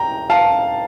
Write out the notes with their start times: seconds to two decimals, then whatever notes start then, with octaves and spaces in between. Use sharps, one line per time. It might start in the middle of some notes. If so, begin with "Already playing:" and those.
Already playing: G5 A#5
0.30 F5 A5